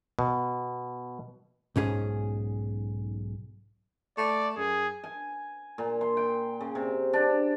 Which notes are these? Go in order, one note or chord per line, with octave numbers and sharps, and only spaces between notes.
B2
B1 G#2 C#4 G#4
A3 D5
F#2 G#4
G#5
A#2
C6
G5
C#3
C3
D4